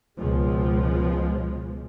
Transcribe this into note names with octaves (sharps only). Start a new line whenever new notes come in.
C#2 B2 F3 G#3